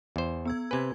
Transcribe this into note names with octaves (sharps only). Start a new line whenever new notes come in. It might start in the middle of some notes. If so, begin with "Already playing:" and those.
E2 C5
B3 E6 G#6
C3 B4 G#5 G#6